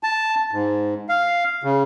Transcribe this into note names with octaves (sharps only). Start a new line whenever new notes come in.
A5
G#2
F5
C#3